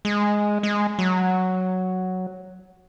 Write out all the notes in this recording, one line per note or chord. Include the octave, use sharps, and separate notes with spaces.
G#3
G#3
F#3